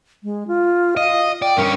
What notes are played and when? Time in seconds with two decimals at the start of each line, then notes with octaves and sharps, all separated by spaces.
0.23 G#3
0.48 F4
0.97 D#5 F5
1.42 D5 G5
1.57 G2 C#4 A#4